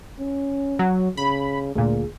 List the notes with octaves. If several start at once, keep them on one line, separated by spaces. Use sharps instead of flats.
C#4
F#3
C#3 B5
D2 A#2 G#4